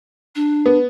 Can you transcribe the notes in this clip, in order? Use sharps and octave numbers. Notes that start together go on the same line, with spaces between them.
D4
B3